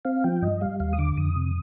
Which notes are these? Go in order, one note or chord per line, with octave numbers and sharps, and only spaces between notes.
C4 F5
F3 G5
G2 D#5
G3 F5
D#2 F5
D#6
D3 D6
F2 D#6
C3